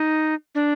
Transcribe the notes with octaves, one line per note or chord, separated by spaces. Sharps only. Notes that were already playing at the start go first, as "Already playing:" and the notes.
Already playing: D#4
D4